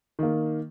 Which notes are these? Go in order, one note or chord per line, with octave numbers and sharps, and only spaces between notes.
D#3 A#3